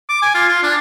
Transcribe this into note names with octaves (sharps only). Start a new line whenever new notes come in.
D6
G#5
F4
F4
D4